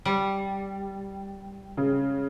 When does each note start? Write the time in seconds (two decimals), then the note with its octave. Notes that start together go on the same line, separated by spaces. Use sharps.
0.05 G3
1.77 C#3 G#3